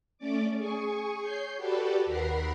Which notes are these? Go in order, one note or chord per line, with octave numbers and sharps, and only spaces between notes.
A3 C#4 D5 D6
G#4 G#5 C#6
C#5 G6 C7
F#4 G4 A4 B4 D5
D#2 A#4 F#5 B5 C7